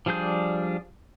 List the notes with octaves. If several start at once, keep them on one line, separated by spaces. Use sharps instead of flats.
F3 G3 D4 G#4 G6